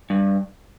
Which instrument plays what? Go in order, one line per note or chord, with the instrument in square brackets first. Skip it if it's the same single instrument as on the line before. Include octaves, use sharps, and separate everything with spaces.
[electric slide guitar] G2